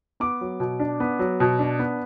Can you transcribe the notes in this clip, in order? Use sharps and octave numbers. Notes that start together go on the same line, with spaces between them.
B3 D6
F#3
B2
D4
B3
F#3
B2
D4
B3